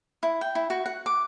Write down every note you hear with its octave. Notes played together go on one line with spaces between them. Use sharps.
E4
G5
E4
F#4
F#5
D6